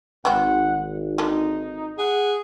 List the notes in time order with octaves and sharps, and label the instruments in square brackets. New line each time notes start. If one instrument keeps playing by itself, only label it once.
[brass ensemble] G#1 [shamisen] B3 C4 [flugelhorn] F#5
[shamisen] D3 G#3 A#3 [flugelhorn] D#4
[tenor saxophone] G#4 [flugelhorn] F#5